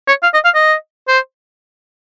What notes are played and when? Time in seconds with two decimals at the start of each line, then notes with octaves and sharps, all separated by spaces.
0.08 C#5
0.23 F5
0.34 D#5
0.45 F5
0.55 D#5
1.08 C5